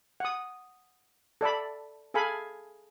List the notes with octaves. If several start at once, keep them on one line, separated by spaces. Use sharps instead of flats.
F#5 D#6
A4 D5 A5 B5
G#4 A4 F5 G#5 B5